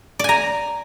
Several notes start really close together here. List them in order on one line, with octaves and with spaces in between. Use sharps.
D5 G#5 A#5